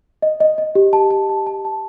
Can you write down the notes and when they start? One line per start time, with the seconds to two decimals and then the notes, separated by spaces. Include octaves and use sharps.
0.22 D#5
0.40 D#5
0.58 D#5
0.75 G4
0.93 A5
1.11 A5
1.29 A5
1.47 A5
1.65 A5